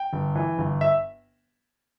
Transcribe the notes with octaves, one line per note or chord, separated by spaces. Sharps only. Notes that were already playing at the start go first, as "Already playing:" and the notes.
Already playing: G5
G1
E3
G1
E5